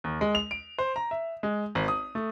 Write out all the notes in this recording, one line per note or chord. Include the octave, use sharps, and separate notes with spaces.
D#2
G#3
F7
D7
C5
A#5
E5
G#3
G#1
D#6
A3